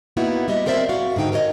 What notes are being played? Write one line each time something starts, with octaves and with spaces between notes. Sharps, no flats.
A#3 B3 D#4 E4 F#4
G3 B3 D#5 E5
C4 A#4 C5 D5 E5
F#4 F5
G#2 D3 D#4 G5
A#4 C5 C#5 D#5